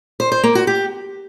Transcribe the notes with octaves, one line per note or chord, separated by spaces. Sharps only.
C5
C5
A#3
F#4
G4